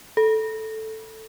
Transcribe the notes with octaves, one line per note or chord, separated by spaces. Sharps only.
A4